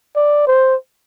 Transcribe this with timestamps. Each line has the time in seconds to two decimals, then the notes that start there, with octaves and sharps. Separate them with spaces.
0.16 D5
0.47 C5